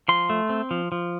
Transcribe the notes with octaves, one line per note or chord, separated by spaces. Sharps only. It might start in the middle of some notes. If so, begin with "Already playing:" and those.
F3 C6
A3
C4
F3
F3